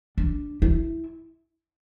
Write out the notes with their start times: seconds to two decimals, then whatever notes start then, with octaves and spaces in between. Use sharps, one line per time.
0.18 D4
0.62 E4